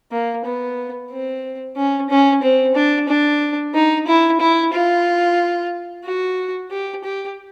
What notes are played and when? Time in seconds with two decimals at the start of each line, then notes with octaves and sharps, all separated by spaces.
0.11 A#3
0.45 B3
1.11 C4
1.77 C#4
2.10 C#4
2.43 C4
2.75 D4
3.09 D4
3.74 D#4
4.07 E4
4.40 E4
4.73 F4
6.05 F#4
6.71 G4
7.04 G4